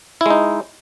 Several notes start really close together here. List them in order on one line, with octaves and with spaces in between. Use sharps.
E4 G#3 D#4